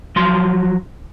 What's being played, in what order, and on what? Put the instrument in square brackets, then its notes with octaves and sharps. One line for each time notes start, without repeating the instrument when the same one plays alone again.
[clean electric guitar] F3 F#3 C6